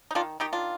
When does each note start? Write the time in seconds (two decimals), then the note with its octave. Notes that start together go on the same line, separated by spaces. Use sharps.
0.11 D#4
0.15 D#3 D4 F4
0.40 D#3 D#4 G4
0.53 D4 F4